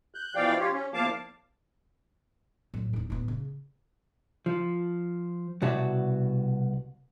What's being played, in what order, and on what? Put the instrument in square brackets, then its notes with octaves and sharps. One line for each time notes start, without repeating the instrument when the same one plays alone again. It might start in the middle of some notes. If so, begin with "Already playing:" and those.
[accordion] F#6 G6
B2 E3 F3 D5 F5 G5
F4 G4 C#5
C#4
E2 F3 A#3 F5 A5 D6
[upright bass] A2 F#3
E2 D#4
A2 B3
C#3
[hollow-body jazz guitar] F3
C2 B2 F#4 C#5 D5 E5